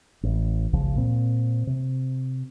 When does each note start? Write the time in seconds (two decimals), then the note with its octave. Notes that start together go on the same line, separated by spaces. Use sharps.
0.23 A1
0.73 G#1 C#2 C#3 F3
0.96 A#2 C4
1.67 C3